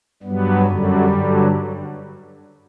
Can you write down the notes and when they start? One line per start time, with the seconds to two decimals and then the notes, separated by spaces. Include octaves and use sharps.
0.23 G2 F#3 G3 B3
0.66 F#2 D3 F#3 G3
1.08 G2 D3 F#3